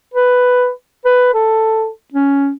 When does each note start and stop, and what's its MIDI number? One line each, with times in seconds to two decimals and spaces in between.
0.14 0.70 71
1.05 1.33 71
1.34 1.88 69
2.14 2.51 61